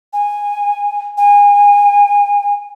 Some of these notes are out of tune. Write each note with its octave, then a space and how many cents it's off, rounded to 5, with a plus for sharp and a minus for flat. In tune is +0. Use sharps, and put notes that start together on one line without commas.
G#5 -15
G#5 -30